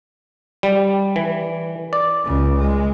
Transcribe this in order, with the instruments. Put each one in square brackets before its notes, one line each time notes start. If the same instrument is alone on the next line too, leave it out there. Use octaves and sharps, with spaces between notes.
[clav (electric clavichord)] G3
E3
D5
[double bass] C#2 C#3
G#3